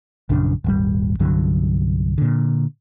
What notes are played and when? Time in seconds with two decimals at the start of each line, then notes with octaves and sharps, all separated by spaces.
0.29 A#1 F#2 C#3 D4
0.64 D#1 G#1 G3
1.20 C2 G2 D3 F#3
2.18 A#2 D3